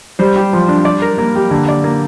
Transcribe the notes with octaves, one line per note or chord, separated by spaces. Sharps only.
G3 C5
G4
F3
D4
D5
A#4
A#3
G4
D3 A#3
D5
A#3